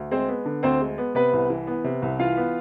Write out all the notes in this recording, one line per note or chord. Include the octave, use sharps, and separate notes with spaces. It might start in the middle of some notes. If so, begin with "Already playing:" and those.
Already playing: D2
G#3 C4 C5
B3
D3
D2 C4 C5
G#3
B3
C3 B3 B4
C2
E3
B3
C3
C2
E3 F4 F5
B3